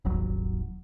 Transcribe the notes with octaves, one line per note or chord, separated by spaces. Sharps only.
D#1 G#1 F#3